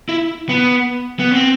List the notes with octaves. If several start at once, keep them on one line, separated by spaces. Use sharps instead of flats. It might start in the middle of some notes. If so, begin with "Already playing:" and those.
E4
B3
B3
C4